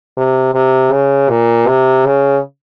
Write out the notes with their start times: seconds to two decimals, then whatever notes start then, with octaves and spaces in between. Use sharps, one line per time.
0.17 C3
0.55 C3
0.92 C#3
1.30 A#2
1.67 C3
2.06 C#3